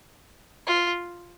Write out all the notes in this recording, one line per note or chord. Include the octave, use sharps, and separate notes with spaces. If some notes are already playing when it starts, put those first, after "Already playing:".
F4